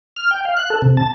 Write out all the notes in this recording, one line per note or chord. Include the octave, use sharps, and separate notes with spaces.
F6
G5
F5
F#6
A4
C3
A5